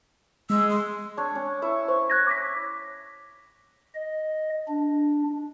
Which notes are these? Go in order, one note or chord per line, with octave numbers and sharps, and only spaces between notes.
G#3 E6
C6
D4 C#5
C#4
E4 C#5 E6
C5 C#6
F#6 G#6 A#6
D6 A#6 B6
D#5
D4